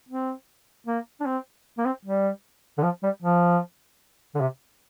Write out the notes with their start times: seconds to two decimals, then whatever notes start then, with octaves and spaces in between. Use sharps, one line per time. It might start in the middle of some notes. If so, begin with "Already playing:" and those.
0.09 C4
0.87 A#3
1.20 D4
1.26 C4
1.78 A#3
1.85 C4
2.05 G3
2.78 D3
2.83 F3
3.03 G3
3.22 F3
4.35 D3
4.40 C3